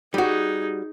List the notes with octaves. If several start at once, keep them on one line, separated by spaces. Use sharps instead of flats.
G3 D#4 F#4 G#4